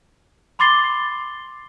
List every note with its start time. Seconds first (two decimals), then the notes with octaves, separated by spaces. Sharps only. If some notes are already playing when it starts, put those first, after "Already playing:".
0.59 B5 C6 D6 A6 C7 G7